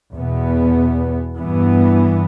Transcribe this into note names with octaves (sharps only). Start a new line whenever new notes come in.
E2 B2 B3
G2 E3 B3